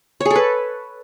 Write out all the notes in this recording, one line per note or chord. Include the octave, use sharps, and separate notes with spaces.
C#5
G#4
A4
B4